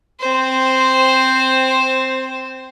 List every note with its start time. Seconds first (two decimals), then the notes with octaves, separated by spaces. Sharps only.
0.20 C4 C5